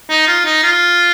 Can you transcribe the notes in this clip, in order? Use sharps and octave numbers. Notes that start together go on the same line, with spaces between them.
D#4
F4
D#4
F4